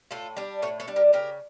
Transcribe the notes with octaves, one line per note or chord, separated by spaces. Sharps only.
A2 F4 A4
G3 D4
A2 A4 C#5
A4 C#5
G3 D4
G4 A#4
C#3 G4 A#4